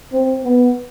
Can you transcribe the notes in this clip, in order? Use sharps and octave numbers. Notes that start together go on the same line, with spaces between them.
C4
B3